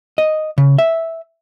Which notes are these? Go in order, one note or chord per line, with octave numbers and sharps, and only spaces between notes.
D#5
C#3
E5